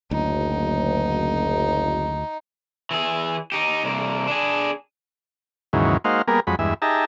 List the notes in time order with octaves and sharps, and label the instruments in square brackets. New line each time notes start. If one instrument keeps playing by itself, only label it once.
[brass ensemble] F#1 [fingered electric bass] D2 [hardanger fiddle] D#4
[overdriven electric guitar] E3 G#4
D#4 G4
C2 A#3
D4 G#4
[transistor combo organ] D#2 G#2 C#3 E3 F#3
G#3 A#3 D#4 F#4 C5 F5
G3 A#3 B3 G#4 A#4
F2 F#3 G#3 B5
E2 G2 G#3 E5
D#4 G4 G#4 E5 A5 A#5